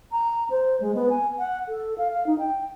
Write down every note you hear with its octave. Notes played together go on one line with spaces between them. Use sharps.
A#5
C5
G#3
B3
G#5
F#5
A4
F5
F5
D#4
G5